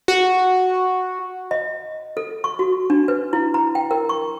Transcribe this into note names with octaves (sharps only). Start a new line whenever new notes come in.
F#4
D#5
A4
C#6
F#4
D4
B4
E4
A#5
G5
A#4
C#6